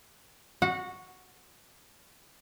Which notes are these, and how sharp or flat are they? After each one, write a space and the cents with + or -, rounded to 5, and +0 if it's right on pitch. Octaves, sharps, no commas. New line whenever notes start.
F#4 +0 F#5 -25